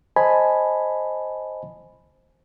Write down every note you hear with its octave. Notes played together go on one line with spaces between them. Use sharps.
C5 D#5 G#5 A5 B5